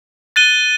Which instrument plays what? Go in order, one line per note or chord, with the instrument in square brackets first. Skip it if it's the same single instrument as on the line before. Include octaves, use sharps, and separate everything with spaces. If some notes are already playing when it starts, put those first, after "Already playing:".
[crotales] F#6 A6 D#7 G7